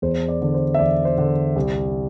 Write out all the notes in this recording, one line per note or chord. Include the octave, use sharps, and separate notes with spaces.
E2 C5
D5
D3
C5
E5
E2 D5
C5
D3
C2